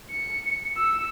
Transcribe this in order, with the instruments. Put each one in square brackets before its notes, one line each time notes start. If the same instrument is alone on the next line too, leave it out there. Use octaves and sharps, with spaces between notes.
[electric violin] C#7
E6